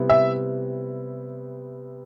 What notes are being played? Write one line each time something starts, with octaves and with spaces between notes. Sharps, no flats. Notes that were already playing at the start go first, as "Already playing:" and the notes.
Already playing: C3 G3 B3 E4
E5